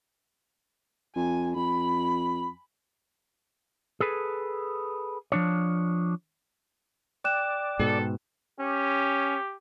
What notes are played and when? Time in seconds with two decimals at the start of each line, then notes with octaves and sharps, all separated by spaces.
1.16 F2 G#5
1.55 F2 B5
4.00 G#4 A4 B4
5.32 F3 D4 C#5
7.24 D5 G5 F#6 E7
7.79 G#2 B2 A4
8.60 C#4 G4